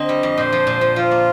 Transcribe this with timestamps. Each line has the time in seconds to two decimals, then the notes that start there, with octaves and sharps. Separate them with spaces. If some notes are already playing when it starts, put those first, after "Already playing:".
Already playing: D3 C4 D#5
0.09 G3
0.23 F2
0.38 A#2 C5
0.53 F3
0.67 A#2
0.81 F3
0.96 F3 F4
1.11 A#3